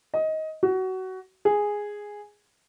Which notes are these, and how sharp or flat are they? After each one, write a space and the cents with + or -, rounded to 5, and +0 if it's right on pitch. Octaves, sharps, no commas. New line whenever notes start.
D#5 +15
F#4 +20
G#4 -5